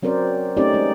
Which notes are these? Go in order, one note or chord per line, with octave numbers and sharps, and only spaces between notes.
F#3 C4 C#4 A#4 C5 D5
A3 C4 C#4 D#4 G4 D5
G#3 D#4